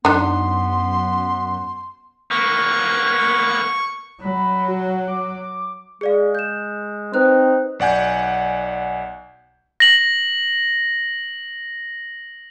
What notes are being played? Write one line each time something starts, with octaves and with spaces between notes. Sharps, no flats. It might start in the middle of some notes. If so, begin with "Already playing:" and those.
F#2 B3 D4 D#4 C6
A#3 B3 C#6
F#3 B5
F#4
D6
G#3 G#4 D5 F5
G6 E7
C4 D#4 B4 C5 F#6
B1 D5 F#5 G#5 G6
A#6 F#7